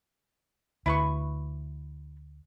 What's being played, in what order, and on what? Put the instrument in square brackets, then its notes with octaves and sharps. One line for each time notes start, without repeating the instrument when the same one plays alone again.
[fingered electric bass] D2 [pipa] E4 B4 C#6